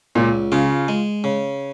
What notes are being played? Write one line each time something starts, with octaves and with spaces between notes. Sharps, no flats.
C#2 A#2
C#3 F4
G#3
C#3